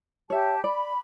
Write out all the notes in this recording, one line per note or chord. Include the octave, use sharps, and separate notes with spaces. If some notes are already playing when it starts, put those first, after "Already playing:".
G4 C#5 E5 A5
D5 B5